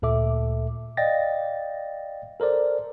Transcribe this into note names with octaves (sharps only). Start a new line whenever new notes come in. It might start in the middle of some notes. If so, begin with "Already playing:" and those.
D2 A#2 A4 E5 D6
D5 D#5 F5 G5 A6 A#6
A4 A#4 C5 D5